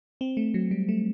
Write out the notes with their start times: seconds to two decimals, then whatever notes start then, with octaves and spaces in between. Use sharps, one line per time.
0.21 C4
0.37 A3
0.54 F#3
0.71 G3
0.89 A3